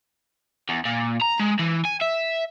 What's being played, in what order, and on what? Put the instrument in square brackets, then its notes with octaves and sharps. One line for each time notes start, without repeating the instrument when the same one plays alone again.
[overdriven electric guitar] E2
A#2
A#5
G#3
E3
G#5
E5